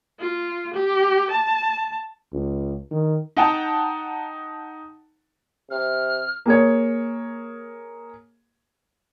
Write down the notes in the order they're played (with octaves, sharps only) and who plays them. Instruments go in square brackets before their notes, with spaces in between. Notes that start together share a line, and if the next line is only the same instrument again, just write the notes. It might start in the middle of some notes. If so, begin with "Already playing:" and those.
[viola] F4
G4
A5
[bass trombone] C#2
D#3
[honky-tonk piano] D#4 F#5 G5 A5 A#5
[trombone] C3 [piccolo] F6
[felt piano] A#3 G#4 C#5